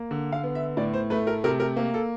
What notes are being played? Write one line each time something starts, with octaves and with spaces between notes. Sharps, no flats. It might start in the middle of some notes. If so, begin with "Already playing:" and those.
Already playing: A#3
D3
F5
B3
E5
A2 D5
C5
A3 B4
A#4
C3 A#4
A#4
A#3
A4